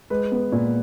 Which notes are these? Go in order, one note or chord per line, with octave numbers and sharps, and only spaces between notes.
G#3 B4
B3
A#2